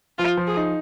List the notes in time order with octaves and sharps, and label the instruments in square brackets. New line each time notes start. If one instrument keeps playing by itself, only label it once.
[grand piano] F3 [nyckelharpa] F4
[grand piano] F3
[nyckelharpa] G#4
[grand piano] D#4